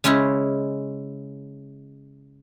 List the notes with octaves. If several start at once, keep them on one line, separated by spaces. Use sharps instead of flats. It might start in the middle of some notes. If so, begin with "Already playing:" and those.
C#3 G#3 C#4 E4